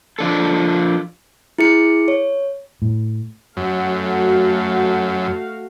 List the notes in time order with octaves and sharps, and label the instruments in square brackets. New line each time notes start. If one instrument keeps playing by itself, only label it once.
[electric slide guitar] F3 D4 A4
[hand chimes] E4 G#4 C#7
C#5
[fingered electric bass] A2
[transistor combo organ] F#2 [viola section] A3 F#4 F5